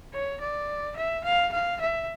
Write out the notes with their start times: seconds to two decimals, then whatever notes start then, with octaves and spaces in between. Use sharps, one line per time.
0.13 C#5
0.41 D5
0.97 E5
1.24 F5
1.52 F5
1.81 E5